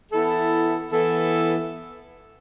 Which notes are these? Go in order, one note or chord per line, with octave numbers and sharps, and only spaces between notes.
E3 B3 E4 A4
E3 B3 E4 A4